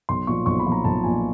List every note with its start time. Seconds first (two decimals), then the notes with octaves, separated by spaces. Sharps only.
0.09 B1 C6
0.27 A#2 F3 C#6
0.46 B1 C#6
0.60 B5
0.66 A#2 F3
0.72 A#5
0.84 B1 A5
1.04 A#2 F3 G#5